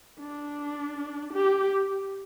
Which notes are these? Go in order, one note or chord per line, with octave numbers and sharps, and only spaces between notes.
D4
G4